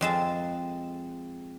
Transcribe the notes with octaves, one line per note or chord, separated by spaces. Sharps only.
F2 G#3 A5